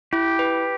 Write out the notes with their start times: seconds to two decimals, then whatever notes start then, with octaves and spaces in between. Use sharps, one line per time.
0.13 E4 G4
0.39 B4